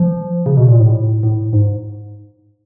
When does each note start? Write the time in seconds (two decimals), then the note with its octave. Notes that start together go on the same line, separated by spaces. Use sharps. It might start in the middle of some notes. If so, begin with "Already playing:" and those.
Already playing: F3
0.46 C#3
0.57 B2
0.69 A#2
0.80 A2
1.23 A2
1.53 G#2